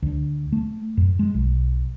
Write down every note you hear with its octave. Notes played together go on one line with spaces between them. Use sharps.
D2
A3
F#2
G#3
B1